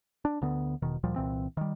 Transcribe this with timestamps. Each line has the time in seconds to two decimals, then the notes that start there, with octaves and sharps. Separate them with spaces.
0.25 D4
0.42 D2 D3 B3
0.82 E1 B2 D#3
1.03 D2 A#2 F3 G3
1.16 C2 A#2 E3 C4
1.57 D#3 G3